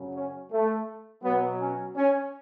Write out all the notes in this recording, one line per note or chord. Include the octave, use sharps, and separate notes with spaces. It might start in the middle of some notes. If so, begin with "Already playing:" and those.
Already playing: F#2 C#3 F#3
C#4
A3
B2 F#3 B3
C#4
C#4